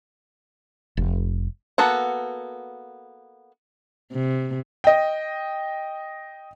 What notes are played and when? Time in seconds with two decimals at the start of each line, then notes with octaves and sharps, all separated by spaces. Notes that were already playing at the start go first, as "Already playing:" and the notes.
0.97 F1
1.78 A#3 B3 F#4 A4 F#5
4.13 C3
4.84 D#5 G5